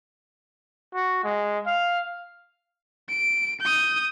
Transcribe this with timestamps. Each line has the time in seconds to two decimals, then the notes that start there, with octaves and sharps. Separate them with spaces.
0.95 F#4
1.24 G#3
1.66 F5
3.09 D7
3.61 D#6 G6